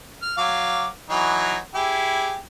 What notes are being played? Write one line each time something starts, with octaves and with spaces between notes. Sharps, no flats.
F6
F#3 F5 D6
E3 F#3 D#4
E4 G4 G#4